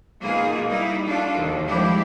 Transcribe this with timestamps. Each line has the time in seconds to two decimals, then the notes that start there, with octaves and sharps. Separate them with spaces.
0.21 B2 A#3 D#4 F4 G#4
0.68 G3 A#3 D#4 E4
1.05 D4 F4 F#4 A4
1.34 D#2
1.66 F3 G3 G#3 D4 E4 G4